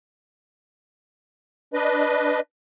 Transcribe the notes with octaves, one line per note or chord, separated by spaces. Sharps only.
D4 B4 D#5